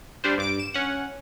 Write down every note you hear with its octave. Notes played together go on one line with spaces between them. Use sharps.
G3 D4 C5
G2 D6 D7
E7
C#4 F#5